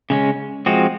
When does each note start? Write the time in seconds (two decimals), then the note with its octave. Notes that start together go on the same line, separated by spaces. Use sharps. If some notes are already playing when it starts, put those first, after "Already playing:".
0.10 C#3 G#3 C#4
0.66 F3 G#3 C4 F#4